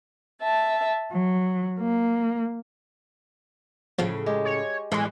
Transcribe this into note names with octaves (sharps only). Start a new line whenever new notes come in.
E5 A5
F#3
A#3
A2 C#3 F3
G#3 G4
C#5
A2 E3 G#3